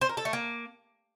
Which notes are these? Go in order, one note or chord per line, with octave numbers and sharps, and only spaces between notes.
C5
A#4
A4
A3
A#3